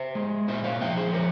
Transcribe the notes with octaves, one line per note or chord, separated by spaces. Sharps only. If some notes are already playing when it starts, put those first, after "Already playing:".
Already playing: C5 E5
G#3
A#2 C5 E5
C#5 F5
F3 E5 G5
G#4 C5
F3 A#4 C#5